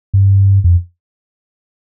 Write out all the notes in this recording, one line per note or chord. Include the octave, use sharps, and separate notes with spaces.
G2
F2